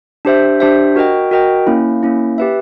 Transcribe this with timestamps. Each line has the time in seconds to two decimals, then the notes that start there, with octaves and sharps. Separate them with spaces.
0.25 D4 G4 C5 E5
0.60 D4 G4 C5 E5
0.96 F#4 A#4 D#5 G5
1.31 F#4 A#4 D#5 G5
1.67 A#3 C#4 E4
2.03 A#3 C#4 E4
2.38 G4 B4 E5